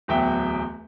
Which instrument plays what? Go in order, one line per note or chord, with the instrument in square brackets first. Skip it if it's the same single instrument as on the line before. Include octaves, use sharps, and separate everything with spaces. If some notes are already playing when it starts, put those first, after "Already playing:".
[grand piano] D1 E2 F#3 E5 G5